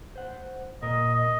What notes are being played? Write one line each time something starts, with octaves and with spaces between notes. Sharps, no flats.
C5 F#5
A#2 A#4 D#5
D#5